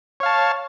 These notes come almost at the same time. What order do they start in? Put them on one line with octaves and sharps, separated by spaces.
C#5 F5 A5